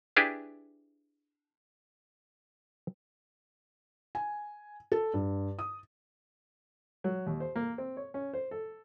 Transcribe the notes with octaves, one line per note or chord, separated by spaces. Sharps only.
D4 E4 G4 G#4 B4
G#5
A4
G2
D#6
F#3
D#2
C5
A#3
C4
C#5
C#4
C5
A4